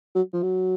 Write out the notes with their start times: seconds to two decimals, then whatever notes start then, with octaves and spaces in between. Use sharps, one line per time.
0.15 F#3
0.33 F3
0.43 F#3